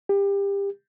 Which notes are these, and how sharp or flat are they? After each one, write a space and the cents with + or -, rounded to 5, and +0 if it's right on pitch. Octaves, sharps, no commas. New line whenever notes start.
G4 +25